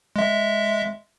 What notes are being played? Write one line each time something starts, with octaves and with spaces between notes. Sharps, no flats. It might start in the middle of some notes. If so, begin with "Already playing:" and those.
G#3 E5